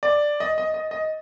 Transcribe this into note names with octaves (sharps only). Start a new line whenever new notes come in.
D5
D#5
D#5
D#5
D#5